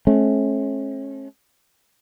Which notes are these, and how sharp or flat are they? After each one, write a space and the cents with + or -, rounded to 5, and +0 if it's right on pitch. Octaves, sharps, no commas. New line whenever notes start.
A3 -40 C#4 -35